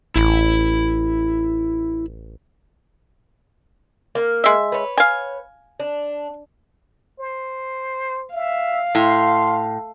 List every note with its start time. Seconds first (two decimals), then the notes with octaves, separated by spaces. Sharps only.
0.16 A1 E4 B5
4.15 A#3
4.44 G#3 E5
4.72 B4 C#5
4.98 F5 G#5
5.80 D4
7.19 C5
8.34 E5 F5
8.95 A2 C6